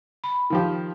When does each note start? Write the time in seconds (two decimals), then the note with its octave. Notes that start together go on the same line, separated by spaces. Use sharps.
0.24 B5
0.50 D#3 F3 G4